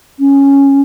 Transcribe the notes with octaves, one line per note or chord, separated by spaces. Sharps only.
C#4